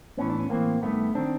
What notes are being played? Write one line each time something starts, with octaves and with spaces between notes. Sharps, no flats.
A2 E3 B3 C#4
D4
C#4
A2 E3 A#3 C4
G2 D#3 A3 B3
D#3 C4 D4